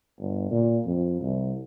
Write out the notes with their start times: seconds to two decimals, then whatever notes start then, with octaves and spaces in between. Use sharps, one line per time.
0.19 G1
0.51 A#2
0.86 F2
1.21 C2